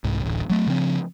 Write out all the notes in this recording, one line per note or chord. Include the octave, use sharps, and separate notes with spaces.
C2 G#2
D1 A1
F#3 A3
C#3 F3 C4